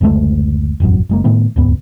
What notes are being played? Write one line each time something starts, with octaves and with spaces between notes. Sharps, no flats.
F#1 D2 G#3 A3
E1 A1 F#2
F#1 G#3 A#3
A2 D#3 A3 B3
D#1 C#2 G2 B3